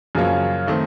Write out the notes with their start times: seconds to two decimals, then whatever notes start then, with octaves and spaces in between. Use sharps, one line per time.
0.15 F#2 C#3 F3 A#3 C#4
0.67 D#3 A3 C4